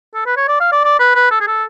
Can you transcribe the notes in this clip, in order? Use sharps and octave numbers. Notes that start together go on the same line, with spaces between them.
A4
B4
C#5
D5
F5
D5
D5
B4
B4
A4
G#4
A4